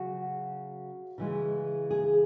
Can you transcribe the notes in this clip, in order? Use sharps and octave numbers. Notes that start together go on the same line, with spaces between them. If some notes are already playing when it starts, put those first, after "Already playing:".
Already playing: C#3 F#3 F#4
C#3 E3 G#3
G#4